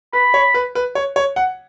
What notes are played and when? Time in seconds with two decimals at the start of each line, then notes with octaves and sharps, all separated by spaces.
0.13 B4 B5
0.34 C#5
0.54 B4
0.75 B4
0.95 C#5
1.16 C#5
1.36 F#5